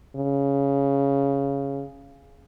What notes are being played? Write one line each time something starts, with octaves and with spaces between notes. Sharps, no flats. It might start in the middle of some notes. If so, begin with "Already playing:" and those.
C#3